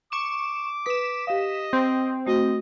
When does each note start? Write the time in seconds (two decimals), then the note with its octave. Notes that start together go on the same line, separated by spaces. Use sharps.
0.12 C#6 D6 E7
0.86 B4 D#6 B6 E7
1.27 G4 D#5 F5
1.73 C4
2.27 A3 F#4 D#5